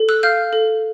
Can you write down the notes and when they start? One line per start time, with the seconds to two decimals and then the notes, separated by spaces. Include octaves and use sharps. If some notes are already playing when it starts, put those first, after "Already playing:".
Already playing: A4
0.09 E6 F#6
0.23 F5 F6 G6
0.53 A4